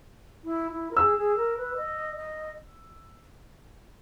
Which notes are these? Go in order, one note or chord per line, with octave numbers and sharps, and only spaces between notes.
E4
E4
A#4
G#4 E6
G#4
A#4
B4
D#5
D#5